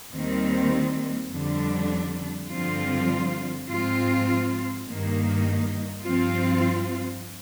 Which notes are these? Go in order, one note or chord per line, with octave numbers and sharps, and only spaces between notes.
D#2 D#3 G3 C4
F2 D3 G3 D4
G2 D3 F3 C4 F4
G#2 F3 C4 F4
G2 D#3 A#3 D#4
G2 F3 C4 F4